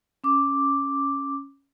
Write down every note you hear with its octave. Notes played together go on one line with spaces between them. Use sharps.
C#4 D6